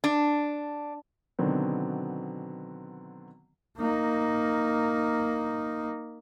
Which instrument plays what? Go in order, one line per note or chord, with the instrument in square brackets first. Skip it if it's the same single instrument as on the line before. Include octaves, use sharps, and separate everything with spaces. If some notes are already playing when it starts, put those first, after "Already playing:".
[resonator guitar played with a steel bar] D4
[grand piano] B2 D3 D#3 F#3 B3 C4
[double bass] A#3 D#4